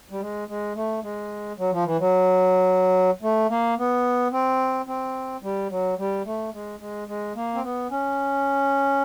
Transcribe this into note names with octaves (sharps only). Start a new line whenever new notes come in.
G3
G#3
G#3
A3
G#3
F#3
F3
E3
F#3
A3
A#3
B3
C4
C4
G3
F#3
G3
A3
G#3
G#3
G#3
A#3
C4
B3
C#4